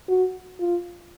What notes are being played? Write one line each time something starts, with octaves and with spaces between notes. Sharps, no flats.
F#4
F4